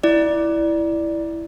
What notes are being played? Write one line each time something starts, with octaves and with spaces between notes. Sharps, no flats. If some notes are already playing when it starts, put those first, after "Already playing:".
E4 D5